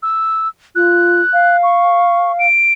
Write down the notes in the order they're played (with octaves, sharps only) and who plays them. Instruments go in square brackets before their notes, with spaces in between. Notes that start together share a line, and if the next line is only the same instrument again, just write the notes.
[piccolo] E6
[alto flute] F4 [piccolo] F#6
[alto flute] F5
[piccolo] C#6
D7